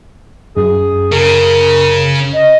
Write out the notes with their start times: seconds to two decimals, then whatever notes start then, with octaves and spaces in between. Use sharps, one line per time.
0.57 F#2 G#4
1.12 C#3 A#4
2.33 D#5